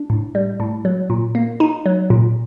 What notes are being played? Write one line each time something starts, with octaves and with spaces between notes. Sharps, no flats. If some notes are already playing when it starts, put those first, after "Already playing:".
Already playing: D4
A2
G3
A2
F#3
A#2
A#3
D#4
F#3
A#2